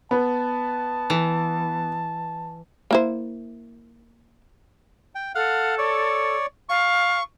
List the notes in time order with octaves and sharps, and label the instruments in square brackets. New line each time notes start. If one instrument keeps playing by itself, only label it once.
[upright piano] B3 [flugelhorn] A5
[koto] E3
[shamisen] A#3 E4 C5
[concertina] G5
[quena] A4 [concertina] F5 F#5
[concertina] C#5 D5
[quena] F5 [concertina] C#6